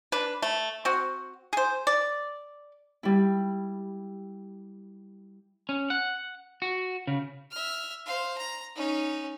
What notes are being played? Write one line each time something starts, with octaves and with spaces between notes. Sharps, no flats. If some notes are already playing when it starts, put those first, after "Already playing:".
D4 B4
A3
C4 F#4
G#4 C5
D5
G3 E4
C#4
F#5
F#4
C#3
E5 F6
C5 F5
A#5
C#4 D#4